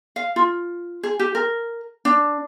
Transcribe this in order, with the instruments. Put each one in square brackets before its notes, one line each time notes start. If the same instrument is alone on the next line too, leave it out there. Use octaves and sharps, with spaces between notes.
[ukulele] F5
F4
G#4
G4
A#4
D4